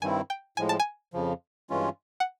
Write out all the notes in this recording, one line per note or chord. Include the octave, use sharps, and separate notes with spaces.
G2 D#3 G3 C4 E4 G#5
G5
A2 F3 G#3 G#5
A5
G#5
F2 C#3 F3
G2 E3 G#3 C#4 F4
F#5